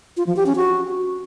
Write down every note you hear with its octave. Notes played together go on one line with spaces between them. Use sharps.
F4
F3
G4
C#4
F#4